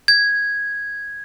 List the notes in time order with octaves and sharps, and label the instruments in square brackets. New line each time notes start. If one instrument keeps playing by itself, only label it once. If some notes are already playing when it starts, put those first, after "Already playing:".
[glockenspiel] G#6